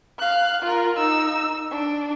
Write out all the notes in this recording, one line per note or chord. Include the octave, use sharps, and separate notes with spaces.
F5 F#6
F4 A#4
D#4 E6
D4